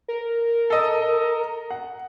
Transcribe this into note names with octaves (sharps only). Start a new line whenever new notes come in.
A#4
A4 D#5
F#5